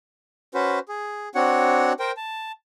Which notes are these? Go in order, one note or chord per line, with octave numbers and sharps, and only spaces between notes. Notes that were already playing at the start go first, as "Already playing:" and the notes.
C#4 F#4 B4 C5
G#4
C4 D4 F#4 C#5 F#5
A#4 C5 G5
A5